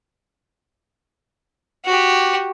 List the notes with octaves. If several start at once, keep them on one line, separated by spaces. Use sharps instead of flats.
F#4 G4